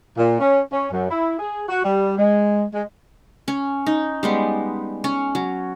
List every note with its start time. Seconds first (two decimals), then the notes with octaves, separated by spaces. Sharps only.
0.17 A#2
0.40 C#4
0.72 C#4
0.91 F#2
1.10 E4
1.39 G#4
1.69 F#4
1.85 G3
2.18 G#3
2.74 G#3
3.48 C#4
3.86 D#4
4.23 G3 G#3 B3
5.04 C#4
5.35 F#3